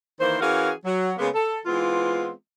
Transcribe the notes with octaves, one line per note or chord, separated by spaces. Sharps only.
D#3 E3 A#3 C5
E3 C#4 F#4 G#4 A#4 F5
F#3
C#3 G#3 A#3 B3
A4
E3 G#3 B3 C4 F4